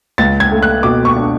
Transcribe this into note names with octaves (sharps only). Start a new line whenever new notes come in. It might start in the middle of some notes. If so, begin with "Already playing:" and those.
C#2 A6
G#6
A3
F#6
B2 D6
C#6
D4